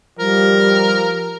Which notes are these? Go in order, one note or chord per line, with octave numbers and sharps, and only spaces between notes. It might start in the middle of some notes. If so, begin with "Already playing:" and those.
F3 G3 A#4